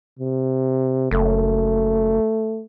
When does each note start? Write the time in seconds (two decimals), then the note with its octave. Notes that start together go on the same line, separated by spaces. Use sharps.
0.19 C3
1.11 F#1 A3